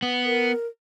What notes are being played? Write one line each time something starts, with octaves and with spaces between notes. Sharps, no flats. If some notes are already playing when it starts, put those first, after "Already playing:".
B3
A#4